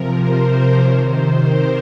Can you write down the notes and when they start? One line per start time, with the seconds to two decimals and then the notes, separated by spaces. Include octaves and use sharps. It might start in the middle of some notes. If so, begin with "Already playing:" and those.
Already playing: C3 F3 A#4
0.18 C5
0.79 C3 D#3 C#5
1.10 C5
1.41 A#4